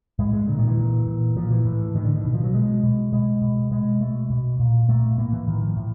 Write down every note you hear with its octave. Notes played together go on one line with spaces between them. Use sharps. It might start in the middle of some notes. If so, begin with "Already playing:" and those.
A2 G#3
G#3
A#2 D3
D#3
E3
A#2
A#2
A#2 F3
E3
A2
A2 D#3
D3
D#3
B2
F3
F#3
B2 G#3
B2
B2 G#3
B2
B2 G#3
B2 A3
B2
A#2
A#2 A3
A2 A#3
E3
A2 D#3
F3
A2